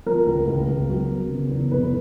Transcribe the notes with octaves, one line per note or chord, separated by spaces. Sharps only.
F3 A#4
C#2
C#2
C#2
F#3
B3
C#3
E2
F1 B4